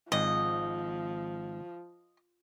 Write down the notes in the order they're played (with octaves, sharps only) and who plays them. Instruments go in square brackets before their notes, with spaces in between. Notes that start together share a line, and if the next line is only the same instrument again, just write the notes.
[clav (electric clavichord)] G#1 G#2 [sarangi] F3 [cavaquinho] D#5